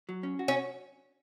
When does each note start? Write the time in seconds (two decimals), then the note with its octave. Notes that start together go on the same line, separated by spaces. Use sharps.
0.09 F#3
0.23 C#4
0.39 F#4
0.48 C#4